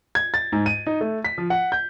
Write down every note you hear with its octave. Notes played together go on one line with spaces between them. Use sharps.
G#6
A6
G#2
D#7
D#4
A3
B6
F3
F#5
G6